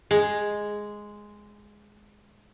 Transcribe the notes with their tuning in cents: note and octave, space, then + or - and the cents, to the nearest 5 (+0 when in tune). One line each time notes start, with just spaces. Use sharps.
G#3 +0